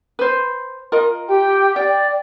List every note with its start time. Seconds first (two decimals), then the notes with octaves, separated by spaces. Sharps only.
0.19 B4 C5
0.92 F4 A#4 D#5
1.29 G4 G5
1.76 D5 G5